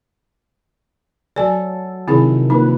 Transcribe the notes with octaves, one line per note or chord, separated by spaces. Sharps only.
F#3 A4 D5 G#5
C3 D#3 F3 C4 E4 G#4
F3 A#3 D#4 B4